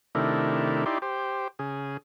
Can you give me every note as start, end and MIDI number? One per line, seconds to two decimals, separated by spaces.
0.15 0.84 48
0.15 0.84 51
0.15 0.84 57
0.15 0.84 62
0.15 0.84 64
0.15 0.84 70
0.86 0.98 63
0.86 0.98 64
0.86 0.98 67
0.86 0.98 74
0.86 0.98 84
1.02 1.48 67
1.02 1.48 72
1.59 1.97 49
1.59 1.97 68